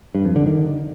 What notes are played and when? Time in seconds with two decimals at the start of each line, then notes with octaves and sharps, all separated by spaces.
0.15 G2
0.25 F2
0.36 D3
0.46 D#3